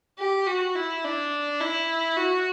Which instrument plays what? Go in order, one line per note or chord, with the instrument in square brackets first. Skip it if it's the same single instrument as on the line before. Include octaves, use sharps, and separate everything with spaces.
[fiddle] G4
F#4
E4
D4
E4
F#4